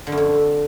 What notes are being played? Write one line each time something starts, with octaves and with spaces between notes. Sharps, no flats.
D3
F#2
F2